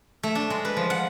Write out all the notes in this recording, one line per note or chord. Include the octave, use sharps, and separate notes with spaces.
A3
D4
G#3
B4
F3
F#5